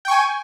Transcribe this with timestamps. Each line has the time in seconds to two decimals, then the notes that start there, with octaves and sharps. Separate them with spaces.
0.05 G5
0.08 C#6
0.11 G#5